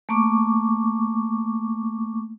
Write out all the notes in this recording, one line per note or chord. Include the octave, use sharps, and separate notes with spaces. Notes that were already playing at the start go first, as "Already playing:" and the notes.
A3 A#3 C#6 D6